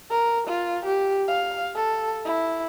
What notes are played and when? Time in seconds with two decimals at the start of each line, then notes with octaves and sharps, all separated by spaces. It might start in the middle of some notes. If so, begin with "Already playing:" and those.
0.10 A#4
0.47 F4
0.85 G4
1.28 F5
1.75 A4
2.25 E4